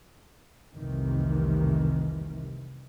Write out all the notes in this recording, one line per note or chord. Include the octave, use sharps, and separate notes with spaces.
F1 C2 C3 D#3 E3